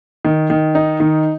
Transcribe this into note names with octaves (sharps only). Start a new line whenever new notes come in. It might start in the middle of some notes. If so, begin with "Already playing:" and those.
D#3
D#3
D#4
D#3